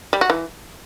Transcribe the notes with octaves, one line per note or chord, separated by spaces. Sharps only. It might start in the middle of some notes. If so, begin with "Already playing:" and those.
G3
F#4
E3